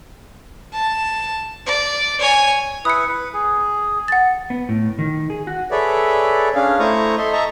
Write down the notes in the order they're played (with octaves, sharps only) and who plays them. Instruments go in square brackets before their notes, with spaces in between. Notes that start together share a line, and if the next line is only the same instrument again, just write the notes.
[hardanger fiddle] A5
D5
C#5 G#5
[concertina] E4 B4 [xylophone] D#6 C#7
[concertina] B4
G#4
[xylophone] F#5 A6
[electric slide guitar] B3
A2
D#3
G#4
F#4
[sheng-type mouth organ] G#4 A4 B4 C#5 D5 E5
C#4 D4 G#4 F5
A3 E4 C5 A#5 C#6 D#6
A4 D#5 E5 C6
D#5 E5 A5 A#5 C#6